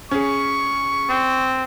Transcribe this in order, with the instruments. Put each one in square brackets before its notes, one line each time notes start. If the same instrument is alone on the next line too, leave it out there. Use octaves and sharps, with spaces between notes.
[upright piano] C#4 G#4 [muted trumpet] C#6
[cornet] C4